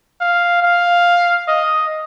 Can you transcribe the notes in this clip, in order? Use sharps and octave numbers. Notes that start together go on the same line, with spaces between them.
F5
F5
D#5